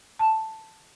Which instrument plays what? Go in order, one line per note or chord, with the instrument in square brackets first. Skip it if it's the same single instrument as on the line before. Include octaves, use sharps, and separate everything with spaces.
[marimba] A5